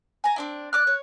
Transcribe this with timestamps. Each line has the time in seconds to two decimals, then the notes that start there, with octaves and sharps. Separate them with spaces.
0.24 G#5 A#5
0.36 C4 D4 E4
0.73 D5 D6 F6 F#6
0.87 C#5